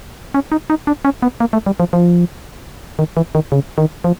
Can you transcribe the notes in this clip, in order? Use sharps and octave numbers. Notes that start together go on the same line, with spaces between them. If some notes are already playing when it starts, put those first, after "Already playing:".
C#4
D#4
D#4
D4
C#4
B3
A#3
A3
G3
F3
F3
D#3
E3
D#3
C#3
D#3
F3